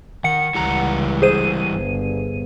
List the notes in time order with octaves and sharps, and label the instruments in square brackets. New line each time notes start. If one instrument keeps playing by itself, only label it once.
[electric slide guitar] D#3 [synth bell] F#5 C#7
[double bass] C#2 [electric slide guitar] E3 G3 A#5
[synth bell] G#4 C5 D#7
[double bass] G1